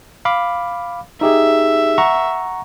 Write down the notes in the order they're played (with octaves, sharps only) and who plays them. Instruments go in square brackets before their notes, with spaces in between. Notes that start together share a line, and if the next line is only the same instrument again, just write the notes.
[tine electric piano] F5 B5 D6
[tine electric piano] D#4 G4 G#4 [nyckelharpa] E5
[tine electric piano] F#5 A#5 C#6